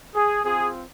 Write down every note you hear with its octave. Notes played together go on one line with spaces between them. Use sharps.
G#4
C4 F4 G#4